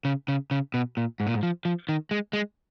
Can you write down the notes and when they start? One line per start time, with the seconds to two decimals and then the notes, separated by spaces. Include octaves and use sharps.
0.05 C#3
0.28 C#3
0.51 C#3
0.74 B2
0.97 A#2
1.20 G#2
1.27 A#2
1.34 G#2
1.43 F3
1.65 F3
1.89 D#3
2.11 G#3
2.33 G#3